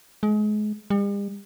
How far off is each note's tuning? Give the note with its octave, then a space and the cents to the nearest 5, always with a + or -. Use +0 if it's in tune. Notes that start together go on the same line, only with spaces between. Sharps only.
G#3 +30
G3 +45